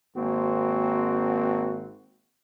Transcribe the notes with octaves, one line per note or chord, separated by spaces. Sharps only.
G#1 A#3 C4 F#4